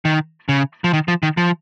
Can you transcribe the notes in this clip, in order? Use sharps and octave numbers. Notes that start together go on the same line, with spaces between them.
D#3
C#3
F3
D#3
F3
D#3
F3